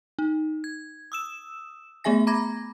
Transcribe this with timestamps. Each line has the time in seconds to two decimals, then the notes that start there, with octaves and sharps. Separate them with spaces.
0.19 D#4
0.64 G#6
1.12 D#6 E6 E7
2.04 A3 B3 G#4 E5 G#5 A#6
2.27 A#5 B5 D6 G#6 A#6